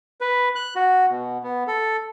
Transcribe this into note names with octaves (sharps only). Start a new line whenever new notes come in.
B4
F#6
F#4
B2
B3
A4